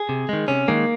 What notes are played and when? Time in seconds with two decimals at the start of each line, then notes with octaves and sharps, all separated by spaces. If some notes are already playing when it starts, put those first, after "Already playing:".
Already playing: G#4
0.09 C3
0.29 D#3 G#3
0.48 C3 C#4
0.68 D#3 G#3 A#3